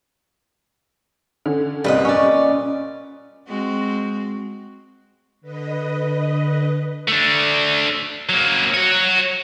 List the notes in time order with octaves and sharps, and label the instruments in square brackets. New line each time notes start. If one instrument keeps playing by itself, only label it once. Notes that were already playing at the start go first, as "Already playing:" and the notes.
[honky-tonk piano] D3 C#4
[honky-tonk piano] C2 G3 [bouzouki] A#2 B4 D#5
[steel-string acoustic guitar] C#4 D5 [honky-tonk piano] C#6
[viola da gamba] G#3 C4 F#4
[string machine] D3 B4 D#5
[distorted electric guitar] A3 D4
F#3 A#3
F#4 C#5